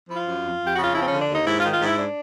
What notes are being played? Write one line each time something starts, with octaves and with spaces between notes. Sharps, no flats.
F3 E4
F4
F#2
F2
F2
G4
C#3 F#4
F4
F3 E4
C4
D3 C#4
D4
D#2
D#4
G#2 E4
F4
D#3
F4
G#2
E4
D4